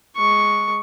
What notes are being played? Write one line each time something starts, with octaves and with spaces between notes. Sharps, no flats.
G#3 C#6